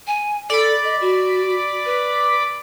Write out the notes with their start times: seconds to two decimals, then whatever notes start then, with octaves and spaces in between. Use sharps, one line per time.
0.07 G#5
0.50 A4 D5 B5
0.84 D#5
1.01 F#4
1.86 B4